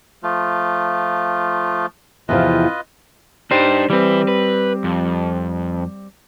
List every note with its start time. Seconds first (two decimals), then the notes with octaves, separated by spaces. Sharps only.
0.23 F3 A3 F4
2.29 E2 C3 F3 F4 B4 D#5
3.51 G3 D4 D#4 G4 C5
3.90 E3 G3 C4 B4
4.28 B4
4.84 F2